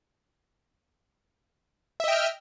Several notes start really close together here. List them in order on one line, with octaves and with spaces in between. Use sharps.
E5 D#5 G5 F6